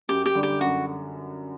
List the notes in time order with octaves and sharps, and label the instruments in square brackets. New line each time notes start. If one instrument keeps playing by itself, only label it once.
[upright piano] F#2 [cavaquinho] G4
[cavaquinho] G4
[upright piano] D3 G3 D4
[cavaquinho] G4
[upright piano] F#2 [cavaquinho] F#4